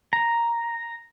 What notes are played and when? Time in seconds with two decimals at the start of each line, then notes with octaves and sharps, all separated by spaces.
0.13 A#5